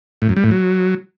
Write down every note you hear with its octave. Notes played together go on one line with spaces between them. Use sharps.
A2
F#2
G3
A2
F#3